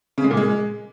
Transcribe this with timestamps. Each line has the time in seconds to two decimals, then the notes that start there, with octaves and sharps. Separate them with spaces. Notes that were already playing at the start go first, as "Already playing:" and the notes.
0.18 C#3
0.24 G#3
0.31 A#2
0.37 G#3